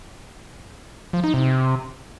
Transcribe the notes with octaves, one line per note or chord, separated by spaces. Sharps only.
F3
D#4
C3